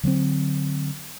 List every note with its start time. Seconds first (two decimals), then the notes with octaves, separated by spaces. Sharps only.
0.03 D3 F#3 G3 C4